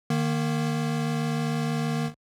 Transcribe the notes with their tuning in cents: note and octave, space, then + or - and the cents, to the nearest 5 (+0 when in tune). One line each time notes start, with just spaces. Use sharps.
D#3 -20 A#3 +5